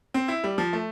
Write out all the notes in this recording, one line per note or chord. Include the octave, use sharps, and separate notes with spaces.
C4
E4
G3
F3
A3